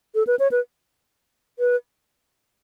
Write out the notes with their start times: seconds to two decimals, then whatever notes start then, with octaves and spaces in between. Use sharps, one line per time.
0.15 A4
0.27 B4
0.39 C#5
0.51 B4
1.59 B4